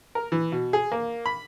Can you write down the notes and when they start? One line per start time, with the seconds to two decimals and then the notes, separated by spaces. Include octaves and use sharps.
0.15 A#4
0.32 E3
0.52 B2
0.73 G#4
0.92 A#3
1.26 B5